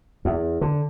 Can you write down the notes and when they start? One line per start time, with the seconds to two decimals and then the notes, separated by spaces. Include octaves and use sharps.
0.25 E2
0.61 D3